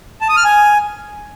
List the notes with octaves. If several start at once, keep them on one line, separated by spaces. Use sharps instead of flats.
A5
D#6
F6
G#5